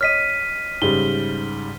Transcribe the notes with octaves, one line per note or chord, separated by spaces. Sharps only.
C#5 D#5 F6 B6 D#7
G#2 C#3 G3 G7